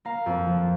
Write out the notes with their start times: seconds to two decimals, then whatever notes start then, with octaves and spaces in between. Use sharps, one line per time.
0.05 A#3 F5 A#5
0.26 F2
0.46 F3